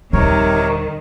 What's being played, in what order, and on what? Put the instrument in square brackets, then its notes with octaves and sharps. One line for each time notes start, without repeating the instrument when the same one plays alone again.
[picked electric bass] D#1 [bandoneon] C3 A#4 C#5 [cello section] D#3 [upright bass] G3